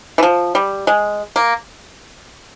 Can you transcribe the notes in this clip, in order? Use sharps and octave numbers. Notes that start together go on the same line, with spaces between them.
E3
F3
G3
G#3
A#3